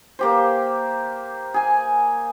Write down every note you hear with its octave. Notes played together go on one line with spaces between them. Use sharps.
A#3 G4 C5
G#4 G#5